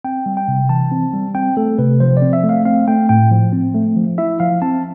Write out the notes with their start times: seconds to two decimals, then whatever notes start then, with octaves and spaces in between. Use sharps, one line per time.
0.04 C4 G5
0.26 G3
0.37 G5
0.48 C3
0.69 E3 A5
0.91 C4
1.13 G3
1.35 C4 G5
1.57 A3 A4
1.79 C3 B4
2.00 F3 C5
2.17 D5
2.22 C4
2.33 E5
2.44 A3
2.49 F5
2.65 C4 F5
2.88 A3 G5
3.09 A2 G5
3.31 F3
3.53 C4
3.75 A3
3.96 F3
4.18 E4 E5
4.40 F3 F5
4.62 C4 A5